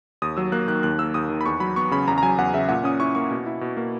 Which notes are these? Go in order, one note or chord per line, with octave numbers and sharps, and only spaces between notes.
D#2 D#6
F#3 E6
A#3 F#6
D#3 F#6
D#2 F#6
A#3 E6
D#2 D#6
D#3
B5
E2 C#6
F#3 B5
B3 C#6
C#3 B5
E2 A#5
A#5
F#3 G#5
E2 F#5
C#3 E5
A#2 F#5
C#4 D#6
E4 C#6
A#3 C#6
B2
E4
B2
A#3